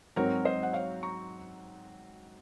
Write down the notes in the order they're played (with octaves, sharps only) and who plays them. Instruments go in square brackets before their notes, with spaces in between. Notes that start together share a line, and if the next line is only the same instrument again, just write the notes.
[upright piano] G#2 F#3 C4 F#4 [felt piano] A#4 C#5
[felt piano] C5 D#5
F#5
C#5 F5
A#5 C#6